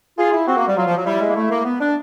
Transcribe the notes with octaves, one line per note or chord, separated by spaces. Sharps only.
F4 G#4
E4
C4 F#4
A#3
G3
F#3 F4
F3
F#3
G3 E4
G#3
A#3
A3
A#3
B3
D4